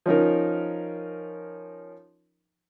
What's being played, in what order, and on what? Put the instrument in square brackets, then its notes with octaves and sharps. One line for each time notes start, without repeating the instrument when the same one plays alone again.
[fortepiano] F3 C#4 D#4 A#4